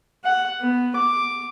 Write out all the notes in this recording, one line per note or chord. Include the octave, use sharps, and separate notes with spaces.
F#5
B3
D6